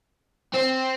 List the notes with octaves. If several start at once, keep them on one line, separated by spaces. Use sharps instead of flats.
C4